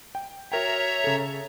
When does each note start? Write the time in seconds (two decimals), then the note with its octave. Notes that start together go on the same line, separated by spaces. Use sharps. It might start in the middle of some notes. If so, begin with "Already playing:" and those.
0.15 G5
0.52 F#4 A#4 C#5 E5 G5 A#5
1.04 C#3 A4